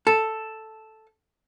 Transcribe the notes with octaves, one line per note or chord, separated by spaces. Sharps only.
A4